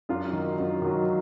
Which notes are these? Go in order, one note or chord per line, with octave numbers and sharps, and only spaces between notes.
F#2 D4 F4
D#3 F#3
F#2 D#4
D#3 F#3